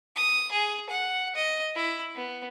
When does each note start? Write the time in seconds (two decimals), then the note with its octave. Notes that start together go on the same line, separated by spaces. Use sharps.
0.16 D#6
0.52 G#4
0.89 F#5
1.35 D#5
1.76 E4
2.15 B3